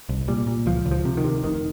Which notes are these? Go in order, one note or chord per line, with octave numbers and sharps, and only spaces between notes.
C2
A#2 G3
A#2
C#2 F3
C#2
F3
C3
D#3
C3
F1 D#3